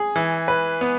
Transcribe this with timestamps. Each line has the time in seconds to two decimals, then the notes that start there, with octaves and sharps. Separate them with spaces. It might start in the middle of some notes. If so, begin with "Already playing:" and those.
Already playing: G#4
0.16 E3
0.48 B4
0.81 B3